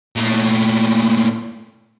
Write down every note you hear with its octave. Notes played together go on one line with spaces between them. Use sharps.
A#2 A3